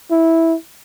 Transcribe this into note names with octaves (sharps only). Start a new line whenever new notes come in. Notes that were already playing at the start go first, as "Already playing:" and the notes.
E4